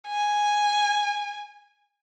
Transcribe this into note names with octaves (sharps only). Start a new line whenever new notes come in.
G#5